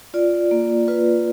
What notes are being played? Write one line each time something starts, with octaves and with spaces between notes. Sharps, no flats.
F4 D5
A#3
F4 B4